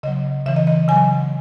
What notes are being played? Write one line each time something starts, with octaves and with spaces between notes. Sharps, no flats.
C#3 F#3 D#5
C#3 E3 E5
D#5
D#5
C#3 F#3 G#5